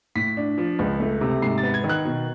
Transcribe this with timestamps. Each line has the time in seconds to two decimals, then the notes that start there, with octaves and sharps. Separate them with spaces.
0.15 A2 B6
0.37 D4
0.58 F3
0.79 C#2
1.00 A3
1.21 C3
1.42 G#2 C7
1.58 A6
1.63 B3
1.74 G#6
1.84 D#3
1.89 F#6
2.05 B2